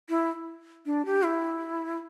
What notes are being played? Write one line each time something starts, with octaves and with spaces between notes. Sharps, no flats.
E4
D4
G4
E4